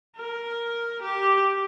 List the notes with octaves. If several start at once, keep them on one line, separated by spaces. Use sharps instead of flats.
A#4
G4